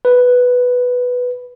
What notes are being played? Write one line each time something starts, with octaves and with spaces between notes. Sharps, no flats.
B4